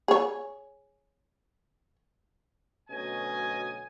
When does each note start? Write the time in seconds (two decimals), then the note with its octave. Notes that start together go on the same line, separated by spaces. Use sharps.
0.08 G#4 C#5
2.89 D2 B2 F#3 C#4 D#5 G#5